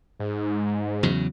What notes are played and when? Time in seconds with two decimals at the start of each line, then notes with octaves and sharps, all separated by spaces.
0.20 G#2
1.03 E2 C#3 F#3